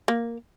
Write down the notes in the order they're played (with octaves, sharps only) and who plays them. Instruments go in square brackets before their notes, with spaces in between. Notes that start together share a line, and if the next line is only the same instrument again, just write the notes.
[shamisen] A#3